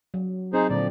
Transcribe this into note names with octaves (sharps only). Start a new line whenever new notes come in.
F#3
C4 D#4 G#4 C5
A#2 D3 F3 F#3 D5